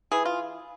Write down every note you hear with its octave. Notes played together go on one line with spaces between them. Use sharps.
E3 G#4
F4